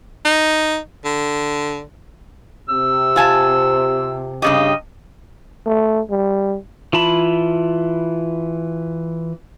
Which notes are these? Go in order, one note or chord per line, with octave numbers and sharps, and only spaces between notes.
D#4
D3
C3 E6
F4 G#5 A5
G2 C#3 G4 D#5
A3
G3
E3 F4 A5 B5